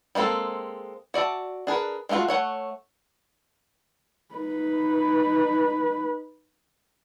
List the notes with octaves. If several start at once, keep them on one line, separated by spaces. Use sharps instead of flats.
G3 G#3 A#3 C4 A4
F#4 D5 E5 A5
D4 G#4 A#4 B4
G#3 A3 C#4 F4 F#4
A3 C#5 F#5
D#4 B4